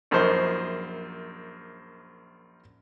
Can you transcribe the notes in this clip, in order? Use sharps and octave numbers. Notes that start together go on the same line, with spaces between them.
A#1 F#2 F3 D#4 C5 C#6